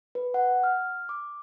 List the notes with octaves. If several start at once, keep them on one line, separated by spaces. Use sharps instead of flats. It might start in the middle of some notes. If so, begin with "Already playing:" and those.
B4
F#5
F6
D6